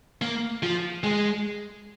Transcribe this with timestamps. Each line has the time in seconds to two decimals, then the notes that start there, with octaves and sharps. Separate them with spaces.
0.22 A#3
0.63 F3
1.03 G#3